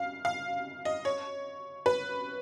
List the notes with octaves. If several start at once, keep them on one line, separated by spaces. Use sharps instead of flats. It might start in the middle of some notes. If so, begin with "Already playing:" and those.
Already playing: F5
F5
D#5
C#5
B4